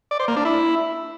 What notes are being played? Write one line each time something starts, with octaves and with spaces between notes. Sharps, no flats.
D5
C5
A#3
D4
E4